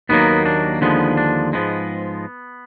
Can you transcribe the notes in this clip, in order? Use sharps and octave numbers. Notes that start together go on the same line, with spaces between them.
D#2 D#3 F#3 A#3 B3
D4
D#2 D3 F3 G#3 B3
D4
G#2 F3 G#3 B3